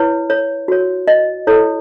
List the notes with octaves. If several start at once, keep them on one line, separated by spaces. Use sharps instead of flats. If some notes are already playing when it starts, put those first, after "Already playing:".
Already playing: E4 B4 C#5
C#5
F#4 C#5
D#5
E4 A4 C#5